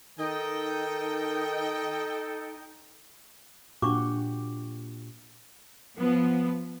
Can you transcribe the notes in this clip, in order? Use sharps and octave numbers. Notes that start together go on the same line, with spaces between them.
D#3 D#4 A4 D#5 G5
A#2 D4 F#4 G4 C#6 D6
F3 B3